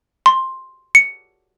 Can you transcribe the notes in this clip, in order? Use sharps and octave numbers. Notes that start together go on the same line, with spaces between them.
C6
C#7